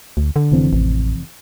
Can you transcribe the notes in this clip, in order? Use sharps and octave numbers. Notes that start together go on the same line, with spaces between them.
D2
D3
F1 E3 C4
A1